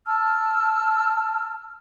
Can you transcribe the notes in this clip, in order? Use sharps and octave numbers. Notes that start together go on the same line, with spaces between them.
A5 E6 F6